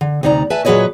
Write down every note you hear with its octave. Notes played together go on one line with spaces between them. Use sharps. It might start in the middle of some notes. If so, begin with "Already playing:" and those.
D3
D2 C3 D#4 D5 A#5
B4 E5 G#5 A5
A#2 F#3 G#4 B4 C#5 D#5